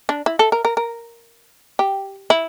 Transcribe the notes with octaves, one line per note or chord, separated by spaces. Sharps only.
D4
E4
A4
A#4
A#4
A#4
G4
E4